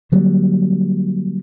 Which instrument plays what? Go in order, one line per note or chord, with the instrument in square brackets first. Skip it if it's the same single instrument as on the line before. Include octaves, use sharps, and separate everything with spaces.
[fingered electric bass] D3 F#3 G3 A#3